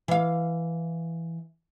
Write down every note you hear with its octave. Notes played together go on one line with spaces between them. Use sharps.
E3 F5